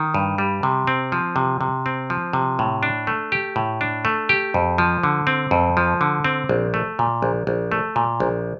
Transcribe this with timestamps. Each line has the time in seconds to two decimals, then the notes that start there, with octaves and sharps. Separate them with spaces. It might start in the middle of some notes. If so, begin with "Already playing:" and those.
Already playing: D#3
0.14 G2
0.38 G3
0.63 C3
0.87 C4
1.12 F3
1.36 C3
1.61 C3
1.86 C4
2.10 F3
2.33 C3
2.59 A2
2.83 D4
3.07 A3
3.32 G4
3.56 A2
3.81 D4
4.05 A3
4.29 G4
4.54 F2
4.78 F3
5.03 D3
5.27 C4
5.51 F2
5.77 F3
6.01 D3
6.25 C4
6.49 A#1
6.74 A3
6.99 A#2
7.22 A#1
7.47 A#1
7.72 A3
7.96 A#2
8.20 A#1